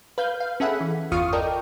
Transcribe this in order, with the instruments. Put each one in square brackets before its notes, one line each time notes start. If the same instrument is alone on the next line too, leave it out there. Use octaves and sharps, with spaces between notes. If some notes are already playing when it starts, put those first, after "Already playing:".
[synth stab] B4 F5 G6
F5
C#4 G#4 A4 E5 F#5 B5
E3
G1 E2 F4 F5 C#6 D#6
A4 A#4 D5 D#5 G5